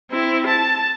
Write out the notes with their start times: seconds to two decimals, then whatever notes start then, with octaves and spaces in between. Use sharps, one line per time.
0.11 C4 E4
0.46 A5